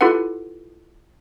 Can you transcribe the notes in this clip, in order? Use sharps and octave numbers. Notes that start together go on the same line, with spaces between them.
E4 F4 G4 A4 B4 F#5